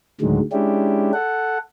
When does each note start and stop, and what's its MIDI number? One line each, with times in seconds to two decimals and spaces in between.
0.21 0.40 38
0.21 0.40 45
0.21 0.40 50
0.21 0.40 51
0.21 0.40 54
0.21 0.40 56
0.52 1.12 56
0.52 1.12 61
0.52 1.12 62
0.52 1.12 64
0.52 1.12 67
1.13 1.58 69
1.13 1.58 78